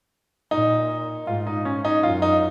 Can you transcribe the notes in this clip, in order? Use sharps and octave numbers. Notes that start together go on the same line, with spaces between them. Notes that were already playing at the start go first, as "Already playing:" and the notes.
A#2 D#4
G#2 F4
D#4
C#4
D#4
F#2 F4
D#4